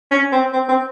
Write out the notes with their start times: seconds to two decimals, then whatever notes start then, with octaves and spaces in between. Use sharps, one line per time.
0.11 C#4
0.33 C4
0.53 C4
0.69 C4